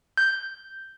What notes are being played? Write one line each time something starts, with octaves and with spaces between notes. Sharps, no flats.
G6